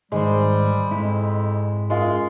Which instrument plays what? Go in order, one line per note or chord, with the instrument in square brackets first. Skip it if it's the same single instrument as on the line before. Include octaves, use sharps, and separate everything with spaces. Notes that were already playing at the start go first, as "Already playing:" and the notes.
[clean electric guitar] G#2 D#3 C5 [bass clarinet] G3 [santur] G#3
[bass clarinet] F2 [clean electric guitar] G#2 E4
[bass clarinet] F#2 [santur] G#3 F4